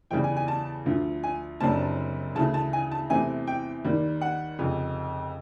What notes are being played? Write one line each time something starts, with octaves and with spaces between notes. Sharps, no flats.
E2 C#3 E3 G3 G5
G#5
G#5
A5
D2 D3 F3
G#5
F#1 F#2 D3 G3 C4 A5
D2 C#3 E3 A3 A5
A5
G#5
A5
E2 C3 E3 A3 C4 G#5
G5
D#2 D#3 G3
F#5
F1 F2 C#3